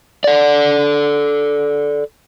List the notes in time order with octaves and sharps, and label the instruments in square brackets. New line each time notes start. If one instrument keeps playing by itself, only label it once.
[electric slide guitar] A4 D5